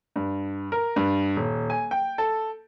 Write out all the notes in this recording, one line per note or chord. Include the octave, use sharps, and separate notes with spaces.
G2
A#4
G2
D#1
G#5
G5
A4